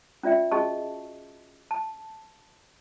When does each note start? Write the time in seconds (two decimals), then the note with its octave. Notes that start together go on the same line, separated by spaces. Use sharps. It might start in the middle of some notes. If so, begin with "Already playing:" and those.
0.23 C#4 F4 D5 E5 G5
0.51 C#4 F#4 G#4 D#5 A5 C#6
1.71 A5